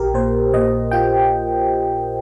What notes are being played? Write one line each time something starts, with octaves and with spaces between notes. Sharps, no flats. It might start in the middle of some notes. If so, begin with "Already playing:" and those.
Already playing: A#1 G4 A#4
A#2 C5
A#2 D#5
F4 G5